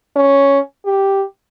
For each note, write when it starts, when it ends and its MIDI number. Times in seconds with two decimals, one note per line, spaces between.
0.16 0.59 61
0.86 1.24 67